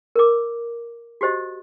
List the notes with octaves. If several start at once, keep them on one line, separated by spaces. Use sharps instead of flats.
A#4 D6
F#4 G4 C5 D#5